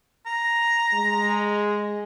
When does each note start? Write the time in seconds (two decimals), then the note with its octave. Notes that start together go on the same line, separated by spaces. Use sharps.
0.26 A#5
0.94 G#3